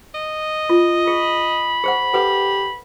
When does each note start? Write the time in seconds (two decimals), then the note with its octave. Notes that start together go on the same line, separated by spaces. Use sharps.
0.14 D#5
0.70 F4
1.07 G#4 B5
1.84 G#4 C5 F#5
2.14 G4 A4 B4 F#5